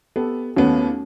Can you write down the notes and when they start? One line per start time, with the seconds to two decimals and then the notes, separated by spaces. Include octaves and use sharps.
0.16 B3 G4 A4
0.57 D#2 A3 B3 C#4 F#4